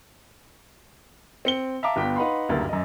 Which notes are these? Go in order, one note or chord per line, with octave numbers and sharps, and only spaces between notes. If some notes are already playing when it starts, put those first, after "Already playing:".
C4 C#7 G7
E5 F5 A5 A#5 D6
G1 B3 F4 G5 D6 B6
D#4 B4 F5 F#5 B5 C6
F#1 D2 G2 D3 A#3 A6
F#2 D#5